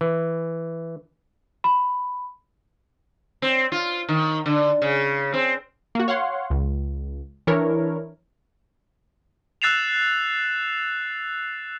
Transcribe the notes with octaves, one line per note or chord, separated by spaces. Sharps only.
E3
B5
C4
F4
D#3
D3
C#3
C4
A#3 F#4
C#5 F5 F#5 C6
C#2
E3 D4 E4 A#4 C#5
E6 F#6 A6 C7 E7 F7